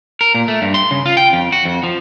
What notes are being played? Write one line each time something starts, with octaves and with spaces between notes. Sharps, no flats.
A#4
A#2
A3
G2
C6
C#3
F4
G5
F2
F#4
F2
F3